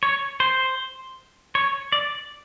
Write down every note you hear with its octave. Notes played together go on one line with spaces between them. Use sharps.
C#5
C5
C#5
D5